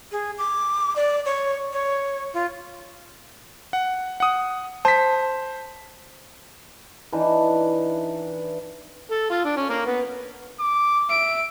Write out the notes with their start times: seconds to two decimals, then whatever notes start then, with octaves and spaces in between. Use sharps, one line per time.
0.12 G#4
0.38 D6
0.96 D5
1.25 C#5
1.73 C#5
2.33 F4
3.73 F#5
4.20 F#5 D#6
4.85 C5 A5 B6
7.12 E3 D4 D#4
9.11 A4
9.30 F4
9.44 D4
9.57 C#4
9.70 A#3
9.86 B3
10.60 D6
11.10 E5 D7